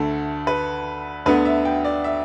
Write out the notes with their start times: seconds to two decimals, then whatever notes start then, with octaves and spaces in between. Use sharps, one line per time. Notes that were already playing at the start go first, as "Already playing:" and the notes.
Already playing: D2 D3 A3 A4
0.47 B4
1.26 D2 D3 B3 B4
1.45 E5
1.65 G5
1.85 D5
2.04 E5